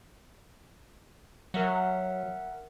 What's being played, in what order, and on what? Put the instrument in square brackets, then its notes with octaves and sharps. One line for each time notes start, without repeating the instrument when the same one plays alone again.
[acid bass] F#3 [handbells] A#4 E5 F#5